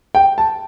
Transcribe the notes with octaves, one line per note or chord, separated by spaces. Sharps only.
G5
A5